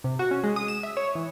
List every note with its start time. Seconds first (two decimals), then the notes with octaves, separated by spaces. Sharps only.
0.04 C3
0.19 F#4
0.31 C#4
0.43 G#3
0.56 D#6
0.68 E7
0.83 E5
0.97 C#5
1.15 E3